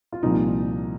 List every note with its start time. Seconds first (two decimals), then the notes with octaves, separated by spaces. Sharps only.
0.12 F4
0.23 C2 A#2 F3 D#4